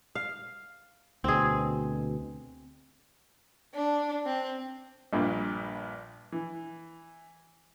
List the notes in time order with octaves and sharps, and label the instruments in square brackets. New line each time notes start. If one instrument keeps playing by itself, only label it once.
[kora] F5
[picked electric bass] D2 B2 [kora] C4 G#4
[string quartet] D4
C4
[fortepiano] A#1 G2 A#2
E3